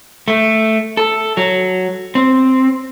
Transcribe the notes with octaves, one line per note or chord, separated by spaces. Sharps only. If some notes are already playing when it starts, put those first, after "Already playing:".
A3
A4
F#3
C4